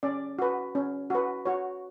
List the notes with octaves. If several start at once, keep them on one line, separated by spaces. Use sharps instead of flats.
C#4 D5
F#4 B4
C#4
F#4 B4
F#4 C#5